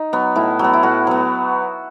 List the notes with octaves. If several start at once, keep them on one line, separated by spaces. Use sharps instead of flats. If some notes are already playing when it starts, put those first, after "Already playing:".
Already playing: D#4
F#3 B3
A2 E4
F#3 B3
E4
A2 F#4
F#3 B3